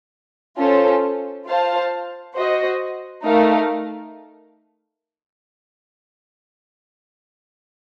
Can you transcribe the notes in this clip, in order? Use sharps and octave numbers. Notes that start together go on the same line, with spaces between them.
C#4 F4 A4 C5
F4 C5 F5 A5
F#4 C5 D#5
A3 D#4 A#4 F5